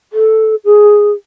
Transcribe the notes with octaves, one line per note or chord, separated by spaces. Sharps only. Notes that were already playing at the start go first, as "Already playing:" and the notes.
A4
G#4